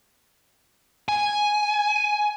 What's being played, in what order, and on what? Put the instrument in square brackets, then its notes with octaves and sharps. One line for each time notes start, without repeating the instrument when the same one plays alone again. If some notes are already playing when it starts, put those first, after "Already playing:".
[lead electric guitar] G#5